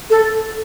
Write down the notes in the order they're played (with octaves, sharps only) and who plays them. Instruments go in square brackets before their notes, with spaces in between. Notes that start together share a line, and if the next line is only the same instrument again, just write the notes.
[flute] A4